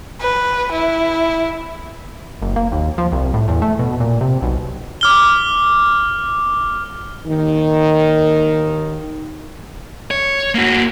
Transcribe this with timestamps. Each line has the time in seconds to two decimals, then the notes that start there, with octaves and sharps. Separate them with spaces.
0.21 B4
0.72 E4
2.42 F#1
2.56 A#3
2.72 D#2
2.98 F3
3.12 C2
3.34 A2
3.48 E2
3.62 A3
3.79 B2
4.00 A#2
4.21 C3
4.42 B1
5.01 D6 F6 G7
7.25 D#2 D#3
10.11 C#5
10.55 A#3 F#4